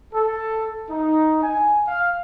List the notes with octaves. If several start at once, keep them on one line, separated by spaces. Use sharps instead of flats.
A4
D#4
G#5
F5